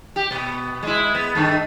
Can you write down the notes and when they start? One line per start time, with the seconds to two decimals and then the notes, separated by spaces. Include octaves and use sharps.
0.16 G4
0.31 B2 B3
0.83 G#3 E4
1.15 B3
1.35 G2 D#3 A3